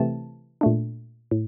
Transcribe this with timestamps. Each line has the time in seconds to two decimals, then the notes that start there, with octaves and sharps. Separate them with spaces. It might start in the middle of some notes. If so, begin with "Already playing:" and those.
Already playing: C3 E3 A3 C4 A5
0.61 A#2 A3 D4
1.31 A2